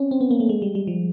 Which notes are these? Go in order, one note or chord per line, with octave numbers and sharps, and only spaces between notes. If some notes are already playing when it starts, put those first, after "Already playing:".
Already playing: C4 C#4
C4
B3
A#3
A3
G#3
G3
G3
F3